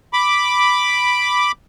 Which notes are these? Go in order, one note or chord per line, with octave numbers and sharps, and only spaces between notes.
B5 D6